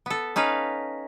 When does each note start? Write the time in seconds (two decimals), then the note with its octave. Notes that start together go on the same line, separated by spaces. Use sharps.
0.06 B3 A4
0.36 C#4 D#4 B4 F5